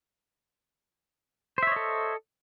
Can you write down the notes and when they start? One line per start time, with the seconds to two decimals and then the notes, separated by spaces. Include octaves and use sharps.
1.58 C5
1.63 E5
1.67 C#5
1.72 D#5
1.76 A4